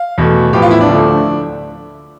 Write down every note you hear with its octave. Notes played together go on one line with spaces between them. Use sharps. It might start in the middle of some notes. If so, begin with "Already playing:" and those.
Already playing: F5
E2 B2 A3
A2 F3 B3 G4
F4
E4
D4
D2 D3 F3 A3